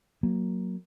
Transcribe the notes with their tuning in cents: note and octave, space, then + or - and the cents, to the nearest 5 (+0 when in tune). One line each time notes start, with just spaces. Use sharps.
F#3 +0 A#3 +0